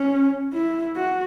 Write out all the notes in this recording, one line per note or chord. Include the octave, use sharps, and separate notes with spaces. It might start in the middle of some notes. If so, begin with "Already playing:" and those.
Already playing: C#4
E4
F#4